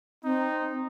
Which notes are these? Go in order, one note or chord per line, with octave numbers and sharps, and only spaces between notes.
C4 D#4